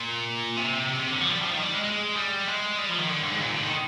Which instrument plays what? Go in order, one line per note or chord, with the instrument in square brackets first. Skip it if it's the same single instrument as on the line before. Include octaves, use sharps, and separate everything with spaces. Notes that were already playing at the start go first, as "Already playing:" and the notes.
Already playing: [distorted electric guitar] A#2
C3
C3
C3
D3
F3
G3
F3
D#3
G3
G#3
G#3
G3
G#3
G3
F3
D#3
D3
G2
G#2
A#2
D3
D#3